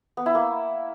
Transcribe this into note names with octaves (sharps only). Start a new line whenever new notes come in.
B3
E4
A#3